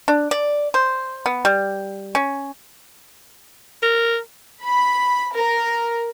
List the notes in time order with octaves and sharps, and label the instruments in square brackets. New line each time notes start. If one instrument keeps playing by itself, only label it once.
[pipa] D4
D5
C5
B3
G3
C#4
[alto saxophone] A#4
[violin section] B5
A#4